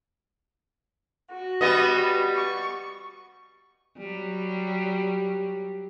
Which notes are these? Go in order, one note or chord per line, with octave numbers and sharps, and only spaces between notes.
F#4
G3 B3 D#5
C#6
F#3 G3